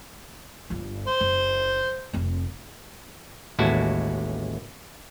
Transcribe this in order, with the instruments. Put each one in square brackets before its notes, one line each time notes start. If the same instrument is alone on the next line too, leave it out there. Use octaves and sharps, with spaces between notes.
[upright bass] G1 G2
[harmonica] C5
[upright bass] F#1
F1 C4
[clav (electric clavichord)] A1 D#2 G#3 E4 F#4 A5